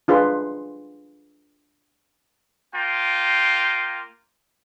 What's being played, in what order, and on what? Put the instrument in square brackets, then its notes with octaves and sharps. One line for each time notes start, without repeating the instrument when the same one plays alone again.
[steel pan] D4 F4 G#4 B4 C6
[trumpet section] A#3 F4 G5